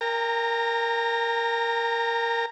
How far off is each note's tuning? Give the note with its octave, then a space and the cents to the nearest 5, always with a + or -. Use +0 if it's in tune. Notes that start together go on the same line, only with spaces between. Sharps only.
A#4 +0 G5 +40 A#5 -25